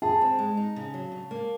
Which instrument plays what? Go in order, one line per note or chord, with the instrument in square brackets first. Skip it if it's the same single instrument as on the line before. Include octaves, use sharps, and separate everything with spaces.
[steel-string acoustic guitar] G#4 [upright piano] A5
[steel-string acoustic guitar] C4
G#3
D#4
C#3
F#3
C#3
A#3